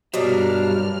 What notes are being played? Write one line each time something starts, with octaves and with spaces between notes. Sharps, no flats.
G2 B2 F#3 A#3 D4 G4 F6